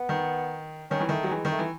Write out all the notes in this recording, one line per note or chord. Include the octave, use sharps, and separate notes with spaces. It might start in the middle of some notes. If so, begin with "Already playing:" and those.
Already playing: B3
D#3
D#3 C#4
E3
D#3 A3
F#3
E3 G#3
D#3
A3
E3